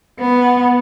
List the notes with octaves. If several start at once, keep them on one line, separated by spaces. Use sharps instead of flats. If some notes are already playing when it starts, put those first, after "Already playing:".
B3